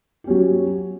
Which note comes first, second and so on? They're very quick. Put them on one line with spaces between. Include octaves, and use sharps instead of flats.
G4 C#4 F#3